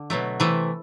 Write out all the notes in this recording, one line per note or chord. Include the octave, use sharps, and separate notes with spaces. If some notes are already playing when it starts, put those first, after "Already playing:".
Already playing: D3
B2 F#3 A3
C3 E3 A3